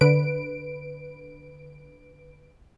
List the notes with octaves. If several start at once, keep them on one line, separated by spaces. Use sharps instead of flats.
D3 B4 D7